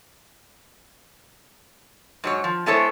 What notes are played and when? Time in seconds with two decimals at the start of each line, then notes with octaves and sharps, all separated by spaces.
2.24 G#2 F#3 C#5
2.44 F3
2.66 G#3 B3 E4 A4 C5 C#5